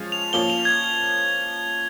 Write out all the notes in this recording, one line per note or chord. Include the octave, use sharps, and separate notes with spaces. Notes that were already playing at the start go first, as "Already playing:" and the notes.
Already playing: F3 G#3 C#4 F4
F7
F3 A#3 C#4 F4 G7
F7
G#6